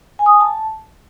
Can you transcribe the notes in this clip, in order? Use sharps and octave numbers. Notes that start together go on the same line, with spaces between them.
G#5
D#6
G#5
A5